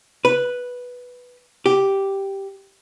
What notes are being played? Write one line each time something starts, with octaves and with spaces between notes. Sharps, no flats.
B4
G4